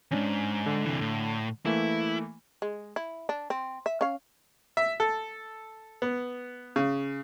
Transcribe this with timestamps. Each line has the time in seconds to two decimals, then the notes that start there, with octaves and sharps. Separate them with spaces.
0.11 E2 G#2 C#4 D4
0.66 D3
0.85 C3 E3
1.01 A2
1.66 E3 A3 A#3 E4
2.62 G#3
2.96 E4
3.29 D4
3.50 C4
3.86 E5
4.01 C#4 F5
4.77 E5
5.00 A4
6.02 B3
6.76 C#3